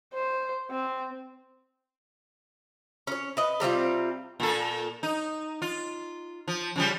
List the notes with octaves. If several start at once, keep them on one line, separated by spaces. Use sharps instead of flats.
C5
C4
C#4 C#5
B4 D#5
C3 G3 C4 F4
A#2 A4
D#4
F4
F3
C#3 F3 G3